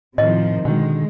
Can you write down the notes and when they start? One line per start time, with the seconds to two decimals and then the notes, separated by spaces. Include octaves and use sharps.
0.18 A2 C3 D#3 F3 D#5
0.65 B2 D3 D#3 G#3